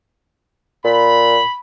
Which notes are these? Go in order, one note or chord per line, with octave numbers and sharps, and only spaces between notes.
A#2 B5